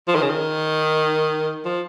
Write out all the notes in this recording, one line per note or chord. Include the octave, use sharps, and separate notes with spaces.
F3
D#3
C#3
D#3
F3